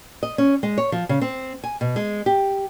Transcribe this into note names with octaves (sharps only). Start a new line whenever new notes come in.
D#5
C#4
G#3
C#5
F3
C#3
C4
G#5
B2
G#3
G4